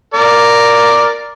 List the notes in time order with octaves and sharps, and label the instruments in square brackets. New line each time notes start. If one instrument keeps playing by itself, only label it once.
[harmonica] A#4 D5